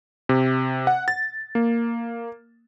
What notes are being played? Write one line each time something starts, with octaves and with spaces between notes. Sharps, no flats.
C3
F#5
A6
A#3